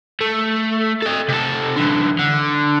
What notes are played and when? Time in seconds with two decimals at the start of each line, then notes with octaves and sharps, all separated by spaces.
0.21 A3
1.02 A4 D#5
1.28 C3 A4
1.76 D3 E3
2.19 D3